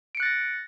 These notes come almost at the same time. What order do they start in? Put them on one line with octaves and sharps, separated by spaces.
D7 C#7 F#6 A6 A#6